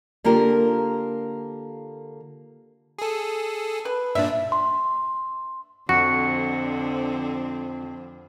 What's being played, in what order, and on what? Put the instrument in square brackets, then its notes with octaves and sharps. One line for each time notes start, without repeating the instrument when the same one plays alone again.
[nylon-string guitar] D3 A#3 F4 G4 A#4
[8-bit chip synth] G#4 A4
[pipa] B4
[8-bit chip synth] G2 A#2 D4 [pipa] E5
[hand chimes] C6
[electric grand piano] F2 [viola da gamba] D3 F3 C4 [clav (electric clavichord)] F#4 [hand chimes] C#7